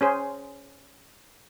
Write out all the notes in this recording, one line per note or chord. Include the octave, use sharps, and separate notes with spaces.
C#4 G#4 C5